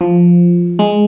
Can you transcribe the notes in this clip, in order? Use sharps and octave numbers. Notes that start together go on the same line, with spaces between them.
F3
G#3